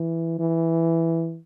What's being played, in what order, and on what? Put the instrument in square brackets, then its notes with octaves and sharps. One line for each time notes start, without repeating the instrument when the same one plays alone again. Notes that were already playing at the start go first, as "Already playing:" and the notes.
Already playing: [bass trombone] E3
E3